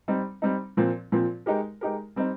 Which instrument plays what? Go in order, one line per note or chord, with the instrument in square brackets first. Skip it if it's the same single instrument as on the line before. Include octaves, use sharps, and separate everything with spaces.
[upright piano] G3 C4 D#4
G3 C4 D#4
A#2 F3 C4 F4
A#2 F3 C4 F4
G#3 D#4 G4 A#4
G#3 D#4 G4 A#4
G3 C4 D#4